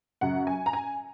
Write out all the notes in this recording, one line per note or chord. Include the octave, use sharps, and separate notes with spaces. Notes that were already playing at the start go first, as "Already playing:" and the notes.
F#2 C#3 F#5
G#5
A#5
G#5